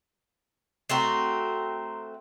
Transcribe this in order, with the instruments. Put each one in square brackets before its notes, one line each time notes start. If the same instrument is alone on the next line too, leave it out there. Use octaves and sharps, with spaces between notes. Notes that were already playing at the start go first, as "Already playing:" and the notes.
[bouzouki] A3 C4 F#4 [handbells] A#5 C6 C7